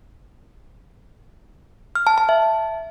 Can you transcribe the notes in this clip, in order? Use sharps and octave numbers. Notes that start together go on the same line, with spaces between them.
F6
A5
A5
E5